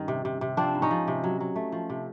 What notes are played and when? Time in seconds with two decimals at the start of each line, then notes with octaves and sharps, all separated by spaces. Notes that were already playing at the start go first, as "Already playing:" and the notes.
Already playing: G2 D#3 C#4
0.08 C3
0.25 C3
0.41 C3
0.57 F3 C4 D4
0.75 G#2
0.82 C#4 D#4
0.91 F3
1.07 C3
1.24 F#3
1.40 F#3
1.56 A3
1.72 F3
1.90 C3